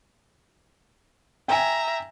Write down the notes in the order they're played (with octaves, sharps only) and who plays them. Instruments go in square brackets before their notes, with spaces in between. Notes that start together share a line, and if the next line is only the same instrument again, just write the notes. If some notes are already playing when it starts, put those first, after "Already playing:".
[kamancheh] E5 A#5 [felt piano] G5 G#5